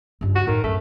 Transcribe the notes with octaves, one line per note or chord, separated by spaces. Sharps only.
C#2 G2
F#4
A2 D#3
F#2 G#3 A3